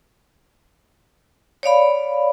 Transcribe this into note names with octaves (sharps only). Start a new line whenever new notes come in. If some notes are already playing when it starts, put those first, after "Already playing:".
C#5 D5 F5 B5